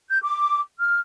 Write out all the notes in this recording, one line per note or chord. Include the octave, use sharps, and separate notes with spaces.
G6
D6
F6